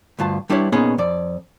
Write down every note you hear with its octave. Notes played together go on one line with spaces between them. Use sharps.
D2 G2 F4 A5
G3 D4 E4 B4 C#5
A#2 B3 C#4 D#4 G#4
F2 D5